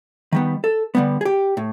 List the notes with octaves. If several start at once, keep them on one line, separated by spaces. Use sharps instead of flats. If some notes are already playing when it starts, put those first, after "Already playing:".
D#3 G3 B3
A4
D3 G3 B3
G#4
G4
A2